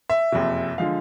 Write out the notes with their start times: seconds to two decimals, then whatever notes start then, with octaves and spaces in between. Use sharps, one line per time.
0.10 E5
0.32 F#1 F2 C3
0.78 D3 F3 G#3 F5